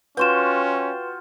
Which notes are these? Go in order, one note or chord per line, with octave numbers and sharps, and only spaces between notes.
C#4 F4 F#4 B4 G5 C6 E7